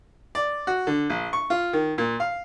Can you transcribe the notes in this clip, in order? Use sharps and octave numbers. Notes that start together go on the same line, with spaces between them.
D5
F#4
D3
A#1
C#6
F4
D#3
A#2
F5